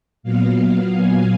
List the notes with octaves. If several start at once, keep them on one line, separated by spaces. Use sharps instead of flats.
A#2 F#3 B3 F5
G#5